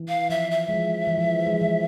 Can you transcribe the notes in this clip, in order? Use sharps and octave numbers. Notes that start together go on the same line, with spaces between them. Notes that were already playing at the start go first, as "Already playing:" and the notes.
Already playing: E3
F5
F3 E5
E5
G#3
F3
E3
F3
G#3
F3
E3